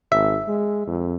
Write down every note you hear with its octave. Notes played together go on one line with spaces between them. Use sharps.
G#1 E5
G#3
F2